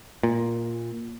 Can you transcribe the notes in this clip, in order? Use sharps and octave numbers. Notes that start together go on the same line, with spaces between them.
A#2